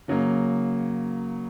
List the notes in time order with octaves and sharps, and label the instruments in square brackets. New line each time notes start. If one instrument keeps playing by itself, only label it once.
[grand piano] C#3 F#3 A#3